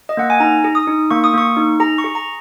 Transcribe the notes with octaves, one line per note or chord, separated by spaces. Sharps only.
D#5
A#3 F#5
G#5
D#4 A#5
G#4
D#6
D#4
A#3 C#6
D#6
A#3 C#6
D#4
G#4 A#5
C#6
G#4
A#5